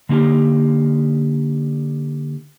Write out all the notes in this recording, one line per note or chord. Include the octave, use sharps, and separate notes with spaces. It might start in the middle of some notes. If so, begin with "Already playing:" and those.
D3 A#3 D#4 G4